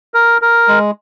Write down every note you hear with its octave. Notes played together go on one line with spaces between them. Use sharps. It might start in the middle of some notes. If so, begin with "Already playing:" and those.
A#4
A#4
G#3